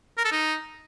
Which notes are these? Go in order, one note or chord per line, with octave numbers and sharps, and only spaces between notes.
A#4
A4
D#4